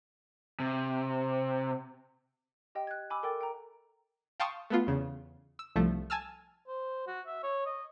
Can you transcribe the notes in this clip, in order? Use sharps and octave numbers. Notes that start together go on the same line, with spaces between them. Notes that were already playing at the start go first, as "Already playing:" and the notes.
C3
G4 D#5 G5
F#6 G#6
G#5 B5 D6 E6
A4 A#4 G5 D6 A6
G5 A#5
F5 G5 A5 C6 C#6 D#6
A3 B3 F4
E2 C#3
E6
C2 F3 A3
G#5 A5 E6 F6
C5
F#4
E5
C#5
D#5